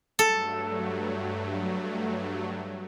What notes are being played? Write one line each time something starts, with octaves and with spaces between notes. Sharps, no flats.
G2 F#3 A3 A4